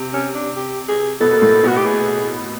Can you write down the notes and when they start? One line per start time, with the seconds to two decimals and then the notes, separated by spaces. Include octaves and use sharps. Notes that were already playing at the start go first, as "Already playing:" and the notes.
Already playing: C3
0.13 C#4
0.35 D4
0.56 G4
0.88 G#4
1.21 B2 B3 A4
1.32 A#3
1.42 A2 A3
1.63 B2 B3 F#4
1.76 G4
1.85 G#4